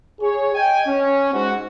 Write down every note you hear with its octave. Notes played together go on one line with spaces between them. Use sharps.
G#4 C#5
D#5 G5 G#5
C#4
G#2 F#4